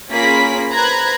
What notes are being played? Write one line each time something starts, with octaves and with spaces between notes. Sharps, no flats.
A#3 C#4 F4 G#4 B5 B6
B4 C5 A#5 B5 F#6 G#6